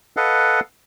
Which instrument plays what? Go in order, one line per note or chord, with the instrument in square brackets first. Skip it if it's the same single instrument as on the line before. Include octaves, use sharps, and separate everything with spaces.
[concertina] A4 B4 D#5 F5 F#5